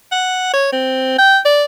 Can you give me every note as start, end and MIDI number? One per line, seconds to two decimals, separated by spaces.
0.12 0.53 78
0.54 0.67 73
0.72 1.14 60
1.19 1.38 79
1.45 1.65 74